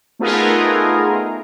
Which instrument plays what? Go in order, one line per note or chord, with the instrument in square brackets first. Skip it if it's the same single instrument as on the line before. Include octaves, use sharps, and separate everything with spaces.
[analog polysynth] A3 B3 D#4 F4 G#4 A#4